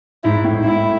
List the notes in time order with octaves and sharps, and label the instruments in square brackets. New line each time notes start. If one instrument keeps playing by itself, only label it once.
[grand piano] G#2 [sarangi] E4
[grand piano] G#2
A2
G#2
[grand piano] A2 [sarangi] E4